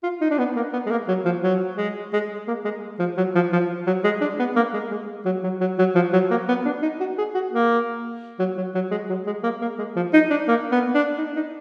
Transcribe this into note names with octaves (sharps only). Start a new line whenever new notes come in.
F4
D#4
D4
B3
A#3
B3
G#3
A#3
F#3
F3
F#3
G#3
G#3
A#3
G#3
F3
F#3
F3
F3
F#3
G#3
D4
B3
A#3
G#3
G#3
F#3
F#3
F#3
F#3
F3
F#3
A#3
B3
D4
D#4
F#4
G#4
F#4
A#3
F#3
F#3
F#3
G#3
F#3
G#3
A#3
A#3
G#3
F3
D#4
D4
A#3
B3
D4
D#4
D#4